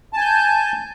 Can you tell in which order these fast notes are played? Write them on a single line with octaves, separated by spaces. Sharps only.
A5 G#5 G6